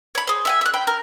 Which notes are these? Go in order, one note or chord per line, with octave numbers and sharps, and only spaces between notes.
C#5 B5
G#4 C5
E5 F#5 G#5
E5 F#6
C5 G5 B5
A#4